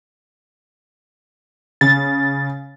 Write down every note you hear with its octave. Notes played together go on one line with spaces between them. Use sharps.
C#3 A6